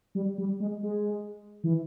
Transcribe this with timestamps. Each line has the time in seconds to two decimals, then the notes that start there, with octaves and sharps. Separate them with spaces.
0.15 G3
0.38 G3
0.60 G#3
0.83 G#3
1.64 E3